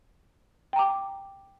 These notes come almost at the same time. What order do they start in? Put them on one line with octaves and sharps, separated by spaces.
G5 A#5 D6